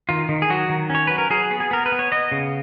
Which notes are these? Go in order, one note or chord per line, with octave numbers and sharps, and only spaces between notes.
D#3 F4
D#3
G#4
F#3 F#4
D#3
C#4 C#5
F#3 B4
A#4
F#3 G#4
B3
G#4
B3 A#4
B4
B3
C#5
B3 D#5
C#3